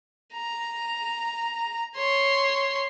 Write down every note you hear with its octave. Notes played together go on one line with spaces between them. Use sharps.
A#5
C#5 C6